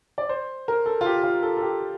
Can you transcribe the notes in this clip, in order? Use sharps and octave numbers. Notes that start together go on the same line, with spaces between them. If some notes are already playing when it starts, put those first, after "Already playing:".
D5
C5
A#4
A4
F4
G4
F4
A4
A4
G4